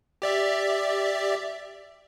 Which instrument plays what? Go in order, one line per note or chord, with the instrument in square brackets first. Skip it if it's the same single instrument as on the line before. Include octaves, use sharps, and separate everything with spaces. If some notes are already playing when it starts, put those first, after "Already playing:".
[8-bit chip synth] G4 D5 E5